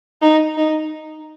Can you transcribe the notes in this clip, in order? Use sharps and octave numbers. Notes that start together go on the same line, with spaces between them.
D#4
D#4